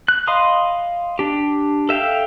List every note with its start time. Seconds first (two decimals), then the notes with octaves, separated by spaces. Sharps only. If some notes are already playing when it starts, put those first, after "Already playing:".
0.08 F#6
0.27 D#5 F5 B5 C6 D#6
1.19 D4 G4
1.89 A4 E5 F5 G5